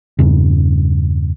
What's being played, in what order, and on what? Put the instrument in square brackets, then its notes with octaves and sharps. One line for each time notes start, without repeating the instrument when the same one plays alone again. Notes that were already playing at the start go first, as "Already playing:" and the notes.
[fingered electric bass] E2 G2 C#3